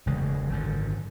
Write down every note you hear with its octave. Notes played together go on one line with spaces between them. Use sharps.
E1 D2 C#3 G#3
G#1 F#2 D3